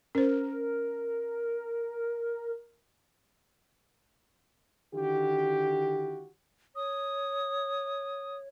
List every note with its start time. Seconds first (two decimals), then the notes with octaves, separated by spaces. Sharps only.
0.15 C#4 A#4 C5
4.94 D3 D#3 E4 F#4 G4
6.76 C#5 D#6